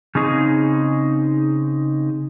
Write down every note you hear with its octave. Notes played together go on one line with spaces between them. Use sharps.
C#3 C4 D#4 G#4